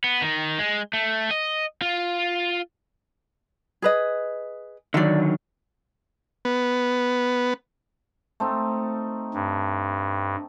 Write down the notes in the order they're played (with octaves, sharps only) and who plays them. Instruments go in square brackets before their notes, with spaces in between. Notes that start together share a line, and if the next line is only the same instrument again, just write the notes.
[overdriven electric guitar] B3
D#3
G#3
A3
D#5
F4
[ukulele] G#4 B4 D#5
[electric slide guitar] D3 D#3 F#3 [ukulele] D5 E5
[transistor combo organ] B3
[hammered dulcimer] A3 C4 D#4
[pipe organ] G2